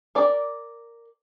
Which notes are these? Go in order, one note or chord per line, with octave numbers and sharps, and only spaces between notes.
A#4 D5